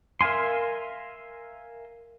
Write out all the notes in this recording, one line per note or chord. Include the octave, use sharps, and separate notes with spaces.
A#4 E5 F5 G#5 C6